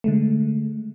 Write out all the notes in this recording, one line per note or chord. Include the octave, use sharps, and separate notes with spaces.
D3 G#3 A3